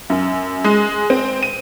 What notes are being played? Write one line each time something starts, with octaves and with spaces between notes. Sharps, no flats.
F#2
G#3
C4
D#7